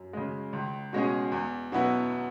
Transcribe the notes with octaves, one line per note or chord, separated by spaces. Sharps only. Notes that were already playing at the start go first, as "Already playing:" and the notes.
Already playing: F#2
C#3 G#3
C#2
B2 G#3 C#4 G#4
E2
B2 F#3 B3 E4